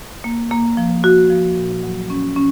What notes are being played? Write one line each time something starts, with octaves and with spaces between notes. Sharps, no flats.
A#3
A#3
F3
F#4
F3
A#2
F#3
C#4
C#4